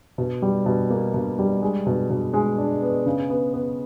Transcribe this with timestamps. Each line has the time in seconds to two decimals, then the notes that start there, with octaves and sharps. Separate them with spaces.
0.18 B2
0.42 G3
0.66 B2
0.90 A#3
1.14 B2
1.39 G3
1.62 G#3
1.87 B2
2.10 B2
2.34 G#3
2.58 D4
2.82 B3
3.06 C#3
3.30 B3
3.54 B3